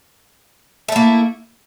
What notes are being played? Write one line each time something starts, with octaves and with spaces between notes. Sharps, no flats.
A3 A#3 E4